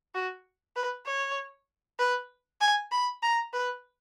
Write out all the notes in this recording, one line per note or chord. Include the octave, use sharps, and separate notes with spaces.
F#4
B4
C#5
B4
G#5
B5
A#5
B4